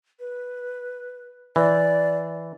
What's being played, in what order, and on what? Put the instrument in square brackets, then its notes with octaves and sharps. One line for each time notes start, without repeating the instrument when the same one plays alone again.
[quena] B4
[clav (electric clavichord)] E3 [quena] D5